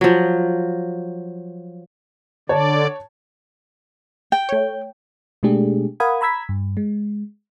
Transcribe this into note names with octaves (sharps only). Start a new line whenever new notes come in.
F3 F#3
D3 C#5 D5 A5
G5
A3 C#5
B2 G#3 A3 D4 G4 G#4
A#4 F5 F#5 B5 D#6 G#6
A#5 B5 E6 G#6 B6
G2
G#3